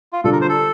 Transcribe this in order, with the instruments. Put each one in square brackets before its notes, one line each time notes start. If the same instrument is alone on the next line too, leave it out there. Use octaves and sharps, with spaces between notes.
[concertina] F4
[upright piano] D3 G3 D4 F4 [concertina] A4
[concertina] A#4
C5
A4